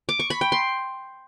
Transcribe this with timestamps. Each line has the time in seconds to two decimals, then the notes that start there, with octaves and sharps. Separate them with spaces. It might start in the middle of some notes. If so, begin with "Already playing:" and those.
0.09 D6
0.19 C#6
0.30 B5
0.41 G5
0.52 C6